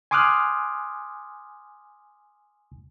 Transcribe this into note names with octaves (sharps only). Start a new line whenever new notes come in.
G#5 C6 D6 D#6 F6 F#6